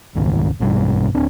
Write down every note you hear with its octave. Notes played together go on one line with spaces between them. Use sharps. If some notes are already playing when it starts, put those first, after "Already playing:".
E1 C#2 G#2 D#3
A#1 G2 B2 G3
D1 C4 D4